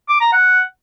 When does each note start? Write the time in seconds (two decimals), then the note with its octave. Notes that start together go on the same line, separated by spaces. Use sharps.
0.09 D6
0.21 A#5
0.33 F#5